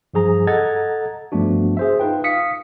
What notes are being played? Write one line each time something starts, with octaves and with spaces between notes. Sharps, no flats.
G2 F3 G#4 A#5
A4 D#5 F#5 A#5 G#6 A6
G2 F3 A3 B3 D4 F#4
G#4 C5 E5
D#4 F4 B4 G5
F5 D#6 B6 C#7